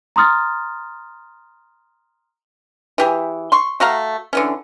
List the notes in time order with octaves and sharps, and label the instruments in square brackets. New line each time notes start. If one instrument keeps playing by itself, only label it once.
[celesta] A#5 C6 D#6 F6 A6
[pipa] E3 G4 G#4
C6 C#6
A3 F#4 F5 A#5
D3 E3 C#4